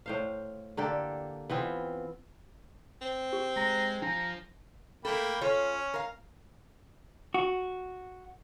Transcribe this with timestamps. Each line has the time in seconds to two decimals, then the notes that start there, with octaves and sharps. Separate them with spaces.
0.06 A2 C5 F5
0.77 D3 A#3 G4 A4
1.50 E3 B3 C4 F4
3.02 C4
3.33 G4
3.57 G#3 A#5
4.02 F3 D4 A#5
5.05 A3 A#3 A4 G5 B5
5.41 C#4 F4 A4 C#5
5.94 A#4 F5
7.34 F#4